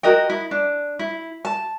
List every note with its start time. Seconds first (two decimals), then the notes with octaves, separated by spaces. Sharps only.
0.03 F#4 A#4 D#5 G5
0.30 E4
0.51 D4
0.99 E4
1.45 A5